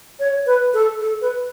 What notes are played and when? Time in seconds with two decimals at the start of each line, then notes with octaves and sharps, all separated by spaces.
0.20 C#5
0.46 B4
0.74 A4
1.01 A4
1.21 B4